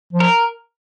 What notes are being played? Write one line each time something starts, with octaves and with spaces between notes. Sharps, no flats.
F3
A#4